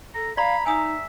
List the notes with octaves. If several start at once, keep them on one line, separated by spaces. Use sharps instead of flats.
A4 A#5
D5 F5 A#5 B5
D#4 E5 G#5 D#6